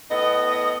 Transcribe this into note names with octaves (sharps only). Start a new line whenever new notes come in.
A2 B3 D#5